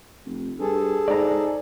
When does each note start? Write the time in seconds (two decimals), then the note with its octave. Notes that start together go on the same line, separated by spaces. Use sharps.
0.26 F1
0.60 G2 G#4 A4
1.08 G#2 D5 A#5